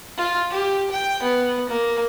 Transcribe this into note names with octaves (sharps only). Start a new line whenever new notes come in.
F4
G4
G5
B3
A#3